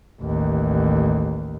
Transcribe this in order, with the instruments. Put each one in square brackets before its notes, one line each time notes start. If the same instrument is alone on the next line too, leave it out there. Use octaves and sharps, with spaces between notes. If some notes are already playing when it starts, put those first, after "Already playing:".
[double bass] A1 D#2